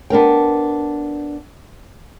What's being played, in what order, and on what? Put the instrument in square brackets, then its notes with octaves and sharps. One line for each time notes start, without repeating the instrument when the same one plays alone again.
[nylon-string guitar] B3 D4 A#4 G5